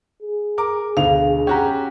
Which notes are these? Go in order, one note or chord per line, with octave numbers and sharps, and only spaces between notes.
G#4
A#4 D6
D2 B2 F5 F7
C#4 F#4 G4 G5 A#5